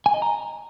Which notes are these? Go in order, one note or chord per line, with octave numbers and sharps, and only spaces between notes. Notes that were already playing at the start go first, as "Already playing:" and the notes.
G#5
D#5
A#5